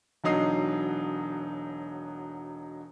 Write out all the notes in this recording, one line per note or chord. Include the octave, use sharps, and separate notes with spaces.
E1 D3 F#3 D#4 D#6 C7